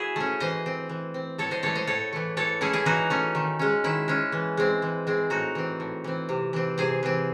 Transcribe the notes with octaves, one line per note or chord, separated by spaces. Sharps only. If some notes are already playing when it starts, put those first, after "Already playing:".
Already playing: E4 F#4 G#4
A3 C#4
E3 C5 D#5
C4
E3
C4
A2 A4 C#5
C5 D#5
E3 A3 A4 C#5
C5 D#5
A2 A4 C#5
E3 A3
E3 A4 C#5
A3 C#4 E4 G#4
E4 G#4
E3 D#4 F#4
A3 C#4
D#3
G#3 C#4
D#3 E4
G#3 C#4
E3
G#3 C4
E3
G#3 C4
A2 D#4 F#4
E3 C4
A2
E3 C4
C3
E3 C4
C3 G#4 C5
E3 C4